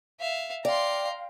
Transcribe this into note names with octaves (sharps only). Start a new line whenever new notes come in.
E5 F5
D5 F5 G5 A#5 C6